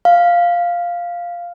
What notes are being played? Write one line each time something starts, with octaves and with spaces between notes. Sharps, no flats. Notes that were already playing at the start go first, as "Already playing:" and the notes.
F5